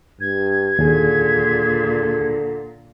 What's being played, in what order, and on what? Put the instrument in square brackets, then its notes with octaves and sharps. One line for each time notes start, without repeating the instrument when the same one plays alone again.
[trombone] G2 [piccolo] G#6
[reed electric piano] D#2 G#4 [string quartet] A#2 [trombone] D3